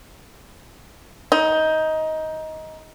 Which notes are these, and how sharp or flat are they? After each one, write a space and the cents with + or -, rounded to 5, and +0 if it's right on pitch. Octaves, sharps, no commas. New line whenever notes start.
D#4 +15